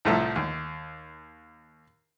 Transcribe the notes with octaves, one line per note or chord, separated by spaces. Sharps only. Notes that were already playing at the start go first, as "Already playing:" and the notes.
C2 A2 F3 E4 A4 A#5
D#2